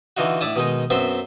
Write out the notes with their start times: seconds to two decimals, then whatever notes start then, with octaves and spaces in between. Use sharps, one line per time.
0.17 D3 E3 D#4 F4 F#4
0.41 A2 D4 E4 A5 D#6
0.56 B2 D#3 G#3 D#4
0.90 F#2 B3 C4 C5 E5